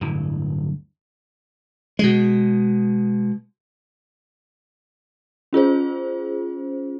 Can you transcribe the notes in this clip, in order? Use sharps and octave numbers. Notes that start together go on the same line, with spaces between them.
D1 G2 E3
B2 G#3
C#4 F4 G#4 C5